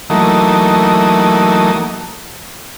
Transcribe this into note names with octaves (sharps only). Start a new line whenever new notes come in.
E3 F#3 A3 A#3 D#4